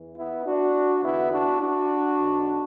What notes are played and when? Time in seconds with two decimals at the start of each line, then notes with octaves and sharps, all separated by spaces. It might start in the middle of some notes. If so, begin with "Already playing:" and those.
Already playing: E2 E3
0.16 B3 E4
0.45 D4 F#4
1.02 E2 D3 B3 E4
1.31 D4 F#4
1.60 D4 F#4
2.18 B1 B2